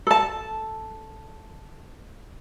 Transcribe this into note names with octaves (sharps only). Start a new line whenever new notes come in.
A4 A5